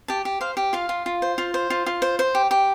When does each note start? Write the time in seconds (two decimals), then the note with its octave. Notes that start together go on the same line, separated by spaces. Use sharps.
0.08 G4 A5
0.25 G4
0.41 C5 F5
0.57 G4
0.73 F4 F5
0.89 F4
1.06 F4
1.22 C5
1.38 F4
1.54 C5
1.70 F4
1.86 F4
2.02 C5
2.19 C5
2.35 G4
2.51 G4